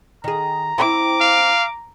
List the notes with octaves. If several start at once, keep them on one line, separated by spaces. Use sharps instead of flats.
D#3 G#4 A#5
C4 E4 D6
F5